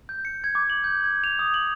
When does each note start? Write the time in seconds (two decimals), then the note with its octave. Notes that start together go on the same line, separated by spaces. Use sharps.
0.09 G6
0.25 C#7
0.44 G#6
0.55 D6
0.70 F#7
0.84 G6
1.04 G#6
1.24 F7
1.39 D#6
1.54 F#7